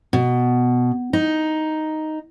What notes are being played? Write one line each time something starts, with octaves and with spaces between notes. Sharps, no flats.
B2
D#4